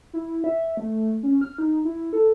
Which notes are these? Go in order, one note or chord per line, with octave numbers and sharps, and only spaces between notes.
E4
E5
A3
C#4
F6
D#4
E4
A4